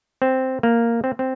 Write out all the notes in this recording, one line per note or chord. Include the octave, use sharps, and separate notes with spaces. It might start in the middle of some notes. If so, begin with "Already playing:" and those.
C4
A#3
C4
C4